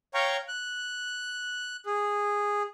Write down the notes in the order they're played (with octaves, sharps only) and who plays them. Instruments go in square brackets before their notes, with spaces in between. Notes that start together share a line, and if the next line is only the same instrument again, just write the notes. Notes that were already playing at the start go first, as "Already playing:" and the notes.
[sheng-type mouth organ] C#5 F5 G5 A#5 C#6
F#6
G#4